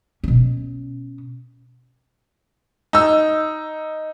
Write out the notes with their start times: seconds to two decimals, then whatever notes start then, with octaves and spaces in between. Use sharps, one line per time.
0.24 B2 C#4
2.93 D#4 E6